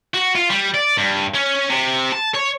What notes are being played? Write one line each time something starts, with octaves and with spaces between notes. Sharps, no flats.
F#4
F4
G3
D5
G2
C#4
C3
A5
C#5